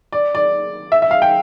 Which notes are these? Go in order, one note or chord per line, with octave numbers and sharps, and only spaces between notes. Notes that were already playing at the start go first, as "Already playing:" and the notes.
D5
D5
E5
E5
F5
G5